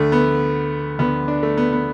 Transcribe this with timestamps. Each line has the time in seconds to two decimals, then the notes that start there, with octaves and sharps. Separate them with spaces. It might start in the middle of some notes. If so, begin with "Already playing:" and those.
Already playing: D2 D3 A3
0.12 B3
0.99 D2 D3 B3
1.28 D4
1.43 A3
1.57 B3
1.72 B3